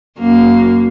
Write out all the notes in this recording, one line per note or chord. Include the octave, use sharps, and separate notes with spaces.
F#2 A#3